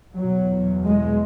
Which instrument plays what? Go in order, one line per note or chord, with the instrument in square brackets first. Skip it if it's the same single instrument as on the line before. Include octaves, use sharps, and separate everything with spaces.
[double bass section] E2 B2 F#3
G#3